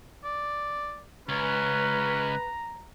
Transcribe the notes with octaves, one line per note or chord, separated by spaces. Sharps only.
D5
C#2 C#4 B4 A#5